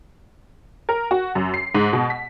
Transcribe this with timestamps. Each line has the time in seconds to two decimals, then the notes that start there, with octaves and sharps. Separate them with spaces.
0.89 A#4
1.11 F#4
1.35 F#2
1.54 C7
1.75 G#2
1.93 B2
2.10 B6